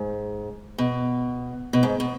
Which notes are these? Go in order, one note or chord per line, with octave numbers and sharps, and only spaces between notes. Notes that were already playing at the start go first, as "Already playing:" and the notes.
Already playing: G#2
B2
B2
G#2
B2